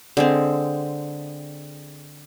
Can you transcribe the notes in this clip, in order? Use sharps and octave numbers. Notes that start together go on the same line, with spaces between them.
D3 G#3 C4